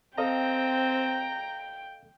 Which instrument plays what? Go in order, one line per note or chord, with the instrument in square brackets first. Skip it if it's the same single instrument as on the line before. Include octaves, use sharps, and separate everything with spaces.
[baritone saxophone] C4 [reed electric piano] A4 D#5 F5 [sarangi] G5 [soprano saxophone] A#5